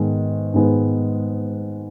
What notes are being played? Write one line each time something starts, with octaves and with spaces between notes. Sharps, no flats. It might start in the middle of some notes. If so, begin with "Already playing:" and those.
Already playing: G#2 D#3 G#3 B3
G#2 D#3 G#3 B3